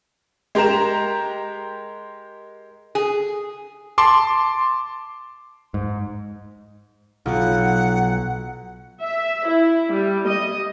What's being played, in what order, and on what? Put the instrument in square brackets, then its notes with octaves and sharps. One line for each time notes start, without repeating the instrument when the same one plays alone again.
[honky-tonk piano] G#3 G4 A#4 A#5 E7
[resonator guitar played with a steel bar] G#4
[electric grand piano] A5 C6 D6
[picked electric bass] G#2
[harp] B1 F4 [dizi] F#5
[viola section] E5
E4
G3
D#5